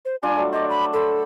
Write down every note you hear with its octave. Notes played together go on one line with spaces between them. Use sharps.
C5
G3 D4 F4 G#5
F#3 A3
C5 D5 D#5
B5
A4 C5 B5